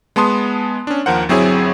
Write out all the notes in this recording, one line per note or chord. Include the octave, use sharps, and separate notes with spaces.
G#3 B3 A5 C6 D#6
C#4 D4
D#2 F3 A#4 C5 F#5
G1 F#3 C4 E4 G#4 C#5